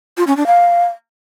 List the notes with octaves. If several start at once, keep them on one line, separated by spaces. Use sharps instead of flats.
F4
C#4
D4
F5